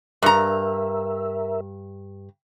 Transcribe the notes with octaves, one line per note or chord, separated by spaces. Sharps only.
G2 A#4 E5 A#5